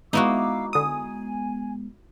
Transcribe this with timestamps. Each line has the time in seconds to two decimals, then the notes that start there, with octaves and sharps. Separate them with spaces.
0.13 G#3 B3 D#4 E4 F#4 F5 D6 E6
0.73 D3 G#5 D#6